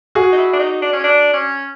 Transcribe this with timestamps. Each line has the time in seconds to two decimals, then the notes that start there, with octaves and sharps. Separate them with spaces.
0.15 F#4 G#4
0.32 D#4
0.37 E4
0.53 D4
0.59 D#4
0.82 D4
0.93 C#4
1.04 D4
1.33 C#4